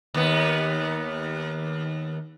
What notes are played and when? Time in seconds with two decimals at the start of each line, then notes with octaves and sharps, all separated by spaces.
0.14 D#2 B3